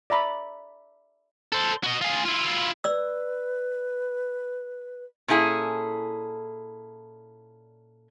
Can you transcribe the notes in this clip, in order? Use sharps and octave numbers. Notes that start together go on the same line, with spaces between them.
D5 E5 A#5 B5
A4 C5
F#4 D#5
F4 G#4
E4 F4
B4 D5 E6
A#2 C#4 E4 G#4 A4